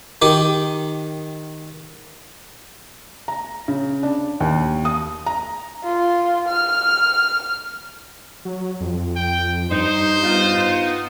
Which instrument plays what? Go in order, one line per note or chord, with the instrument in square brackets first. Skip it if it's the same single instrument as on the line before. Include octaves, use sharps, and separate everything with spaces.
[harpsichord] D#3 G4
[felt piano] A#5
C#3
D4
D#2
D#6
A#5
[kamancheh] F4
F6
[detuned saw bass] F#3
F2
[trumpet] G5
[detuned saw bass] G2 [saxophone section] D#4 [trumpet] C5
[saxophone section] B3 D#4 F4